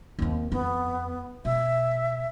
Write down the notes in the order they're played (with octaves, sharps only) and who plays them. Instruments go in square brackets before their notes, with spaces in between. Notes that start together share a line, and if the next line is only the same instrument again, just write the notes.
[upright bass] D#2 C4
[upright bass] F2 [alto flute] B3
[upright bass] B2 [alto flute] E5